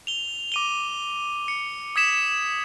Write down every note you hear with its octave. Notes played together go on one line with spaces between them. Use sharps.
F7 G7
D6 D#7 G7
C#7
D#6 G#6 B6 E7